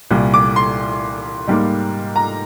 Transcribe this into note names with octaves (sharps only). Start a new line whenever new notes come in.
C2 A#2 G3
D6
C6
G#2 G3 A#3
A#5